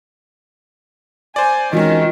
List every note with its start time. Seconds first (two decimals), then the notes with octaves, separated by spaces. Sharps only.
1.36 C5 D5 G#5
1.73 D#3 E3 G#3 C4 C#4 F4 F#4